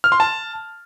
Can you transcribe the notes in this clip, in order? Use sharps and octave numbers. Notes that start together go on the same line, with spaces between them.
F6
C6
A5